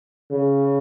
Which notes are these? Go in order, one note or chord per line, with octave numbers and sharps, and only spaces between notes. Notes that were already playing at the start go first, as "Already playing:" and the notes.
C#3